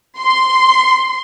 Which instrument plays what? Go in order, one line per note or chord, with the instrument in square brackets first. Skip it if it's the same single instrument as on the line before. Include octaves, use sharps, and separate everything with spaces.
[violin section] C6